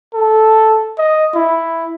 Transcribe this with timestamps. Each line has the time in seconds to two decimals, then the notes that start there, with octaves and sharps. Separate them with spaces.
0.14 A4
0.98 D#5
1.35 E4